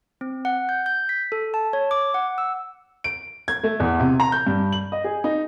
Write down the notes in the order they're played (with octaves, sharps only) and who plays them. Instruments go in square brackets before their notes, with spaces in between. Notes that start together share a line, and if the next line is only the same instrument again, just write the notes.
[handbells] C4
F#5
G6
G6
B6
A4
A5
C#5
D6
F#5
E6
[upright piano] D7
G#6
A3
E2
C3
A#5
G6
G2
F#7
D#5
G#4
D#4